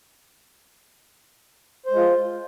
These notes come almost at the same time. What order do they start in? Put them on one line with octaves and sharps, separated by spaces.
C5 G#3 F4